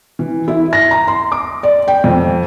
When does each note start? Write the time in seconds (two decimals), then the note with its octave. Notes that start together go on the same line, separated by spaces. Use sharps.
0.19 E3
0.48 E4
0.73 A#6
0.91 A#5
1.08 C6
1.32 D6
1.63 D5
1.88 G5
2.04 F2